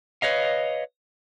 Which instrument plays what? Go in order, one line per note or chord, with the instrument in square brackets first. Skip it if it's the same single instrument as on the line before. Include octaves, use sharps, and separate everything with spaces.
[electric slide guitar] B4 C#5 D#5 F5